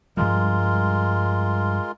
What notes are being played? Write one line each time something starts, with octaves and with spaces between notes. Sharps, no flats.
G2 F3 G3 G#3 F4 A#4